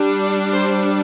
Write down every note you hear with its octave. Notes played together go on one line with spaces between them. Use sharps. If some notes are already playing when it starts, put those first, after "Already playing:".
Already playing: G3 D4
C5